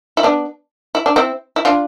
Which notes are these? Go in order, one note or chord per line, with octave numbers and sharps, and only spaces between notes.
E4
B3 D4
E4
D4
C4 E4
E4
D4 F4